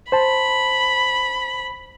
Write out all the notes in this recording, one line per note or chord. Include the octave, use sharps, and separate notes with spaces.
C5 A5 B5